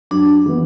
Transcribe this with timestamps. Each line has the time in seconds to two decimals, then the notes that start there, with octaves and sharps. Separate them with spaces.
0.11 F#2 D4
0.46 E3 B3